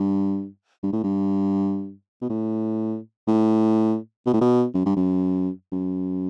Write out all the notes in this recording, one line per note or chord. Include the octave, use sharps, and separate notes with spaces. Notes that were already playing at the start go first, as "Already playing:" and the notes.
Already playing: G2
G2
A2
G2
B2
A2
A2
B2
A2
B2
F#2
G2
F#2
F#2